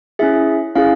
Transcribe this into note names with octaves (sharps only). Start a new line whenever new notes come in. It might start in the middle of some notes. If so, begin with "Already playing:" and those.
C#4 E4 G#4 E5
C#4 E4 G#4 F5